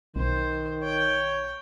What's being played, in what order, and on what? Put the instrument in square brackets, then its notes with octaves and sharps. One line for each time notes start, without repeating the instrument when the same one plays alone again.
[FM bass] B1 [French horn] D#3 [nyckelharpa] C5
[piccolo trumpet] C#5 [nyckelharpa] G5